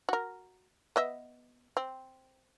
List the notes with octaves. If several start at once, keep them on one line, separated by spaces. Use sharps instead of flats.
F#4 A#4
B3 D#5 E5
C4